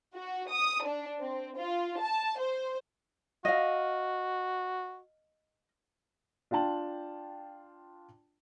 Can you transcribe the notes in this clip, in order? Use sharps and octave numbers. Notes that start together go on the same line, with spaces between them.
F#4
D#6
D4
C4
F4
A5
C5
F#4 D#5 F5
D4 F4 G5 A5 F#7